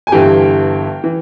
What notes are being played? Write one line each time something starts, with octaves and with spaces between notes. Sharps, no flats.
G#5
G1 G2 E3 G4 G5
E3